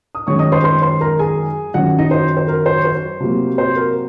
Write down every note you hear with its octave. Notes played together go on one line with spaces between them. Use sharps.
D#6
F#2 D#3 G#3 C#4 C#5 C#6
D#5 D#6
C5 C6
C5 C6
C5 C6
A#4 A#5
G#4 G#5
F#2 D#3 F#3 C#4 F#4 F#5
D#4 D#5
C5
C5
A#4
C5
C#5
C5
C3 F#3 A#3
C5
A#4